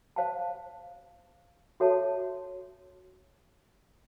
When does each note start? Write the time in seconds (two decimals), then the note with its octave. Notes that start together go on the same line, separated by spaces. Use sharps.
0.16 C5 F5 A5
1.80 F#4 A4 C#5 E5 A5